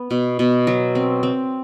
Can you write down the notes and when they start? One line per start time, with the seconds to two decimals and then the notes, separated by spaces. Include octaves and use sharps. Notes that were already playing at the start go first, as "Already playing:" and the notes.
Already playing: B3
0.11 B2
0.39 B2
0.67 F#3
0.95 C4
1.23 C4